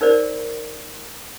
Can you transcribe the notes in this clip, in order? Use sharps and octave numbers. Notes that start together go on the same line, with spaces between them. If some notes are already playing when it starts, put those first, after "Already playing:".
D#4 A#4 C5 D5